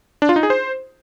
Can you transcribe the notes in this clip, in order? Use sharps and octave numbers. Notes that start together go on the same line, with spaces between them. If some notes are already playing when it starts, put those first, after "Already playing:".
D4
F4
D#4
G#4
C5